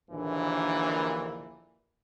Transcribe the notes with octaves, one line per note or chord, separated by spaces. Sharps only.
A#1 D#2 A#2 D3 E3